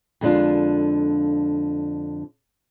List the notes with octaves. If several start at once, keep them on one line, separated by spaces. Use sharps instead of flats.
F2 D3 G#3 D4 F4